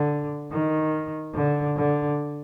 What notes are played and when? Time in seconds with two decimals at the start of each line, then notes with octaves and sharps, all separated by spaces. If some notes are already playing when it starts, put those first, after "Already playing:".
Already playing: D3
0.51 D#3
1.34 D3
1.76 D3